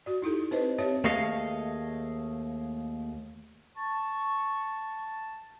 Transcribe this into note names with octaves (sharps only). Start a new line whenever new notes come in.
F#4 D5
D#4 E4 G4 A4
C4 B4 C5 D#5
C4 G4 C#5 E5
D#2 A3 G#4 D#5 F5
A5 C#6